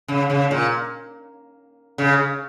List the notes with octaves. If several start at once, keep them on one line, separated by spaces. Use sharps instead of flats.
C#3
C#3
A#2
C#3